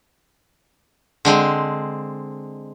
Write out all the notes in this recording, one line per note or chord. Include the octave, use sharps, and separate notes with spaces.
D3 G#3 C4